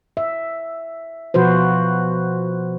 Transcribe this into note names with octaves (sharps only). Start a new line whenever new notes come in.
E5
B2 F3 F#4 B4 C5